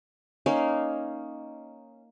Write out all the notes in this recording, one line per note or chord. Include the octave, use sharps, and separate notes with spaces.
A#3 C#4 D#4 F5